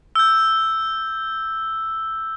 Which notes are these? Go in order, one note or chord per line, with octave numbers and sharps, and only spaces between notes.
E6 G6